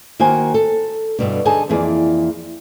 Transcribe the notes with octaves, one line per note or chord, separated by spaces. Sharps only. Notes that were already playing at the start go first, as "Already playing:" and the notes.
D#3 A#3 F#4 C5 G#5
A4
G2 B2 D3
D3 D#4 G#4 G#5 A5
F2 E3 A#3 G#4 D5